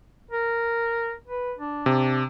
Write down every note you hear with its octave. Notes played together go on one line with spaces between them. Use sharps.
A#4
B4
D4
C3